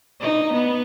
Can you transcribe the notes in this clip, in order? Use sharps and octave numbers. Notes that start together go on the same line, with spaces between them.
D#4
B3